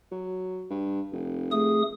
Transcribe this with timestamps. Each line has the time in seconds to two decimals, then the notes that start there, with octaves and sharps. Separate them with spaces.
0.12 F#3
0.70 G2
1.12 F1
1.52 A3 G#4 D#6